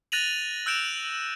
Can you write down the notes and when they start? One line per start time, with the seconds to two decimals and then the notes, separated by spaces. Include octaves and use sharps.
0.12 F#6 A6 A#6 D#7 F7 F#7
0.66 E6 F#6 G6 D7 E7 F7